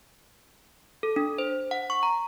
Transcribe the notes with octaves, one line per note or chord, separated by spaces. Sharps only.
A4
D4
C5
F#5
C#6
A#5